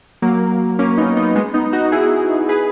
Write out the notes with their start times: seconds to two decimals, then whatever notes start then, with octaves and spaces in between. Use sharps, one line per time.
0.22 F#3 A#3
0.79 A#3 C#4
0.98 B3 D#4
1.16 B3 D#4
1.35 G#3 B3
1.54 B3 D#4
1.73 D#4 F#4
1.92 E4 G#4
2.49 G#4 B4